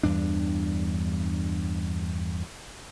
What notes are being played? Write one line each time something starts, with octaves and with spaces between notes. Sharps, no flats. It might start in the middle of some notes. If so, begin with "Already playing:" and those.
E2 G2 D4